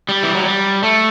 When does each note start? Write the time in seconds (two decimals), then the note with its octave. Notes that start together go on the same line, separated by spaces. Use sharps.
0.09 G3
0.23 E3
0.35 F#3
0.45 G3
0.83 A3